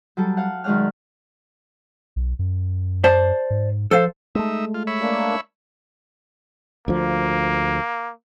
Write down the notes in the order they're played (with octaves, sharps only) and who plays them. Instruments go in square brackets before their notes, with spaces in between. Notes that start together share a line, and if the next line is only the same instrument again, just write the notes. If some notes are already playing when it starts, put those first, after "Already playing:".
[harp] F#3 G3 A4
F5 F#5
F#2 D#3 G#3 D5 F#5 F6
[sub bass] B1
F#2
[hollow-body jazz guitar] C5 D5 A5
[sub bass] G#2
[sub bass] F3 [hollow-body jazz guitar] A4 C5 F5
[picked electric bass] G#3 A3 [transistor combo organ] D#4 E5
[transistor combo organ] F4
C#5 E5 B5
[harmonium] A#3 D4
[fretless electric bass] D2 F3 [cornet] A#3